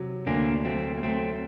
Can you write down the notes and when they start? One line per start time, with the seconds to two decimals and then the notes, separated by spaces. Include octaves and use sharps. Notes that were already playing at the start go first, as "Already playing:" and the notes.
Already playing: C3 F#3
0.27 D2 A#3 D4
0.65 F#3 A3 C4
0.97 A#3
1.03 F#3 A3 C4